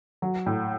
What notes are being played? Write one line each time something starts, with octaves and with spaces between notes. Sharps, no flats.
F#3
A2